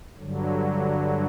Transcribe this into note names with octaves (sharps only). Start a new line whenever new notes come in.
G2 D3 F#3